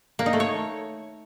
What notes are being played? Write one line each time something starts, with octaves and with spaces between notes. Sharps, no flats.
A#3
D#4
A3
C#5